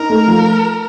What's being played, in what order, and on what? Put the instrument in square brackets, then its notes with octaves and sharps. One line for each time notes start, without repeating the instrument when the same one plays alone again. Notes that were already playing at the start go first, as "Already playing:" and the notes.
Already playing: [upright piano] D#4 [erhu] A#4
[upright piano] A3
F3